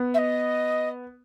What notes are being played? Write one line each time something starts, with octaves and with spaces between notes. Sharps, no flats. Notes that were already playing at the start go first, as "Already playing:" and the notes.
Already playing: B3
E5
D#5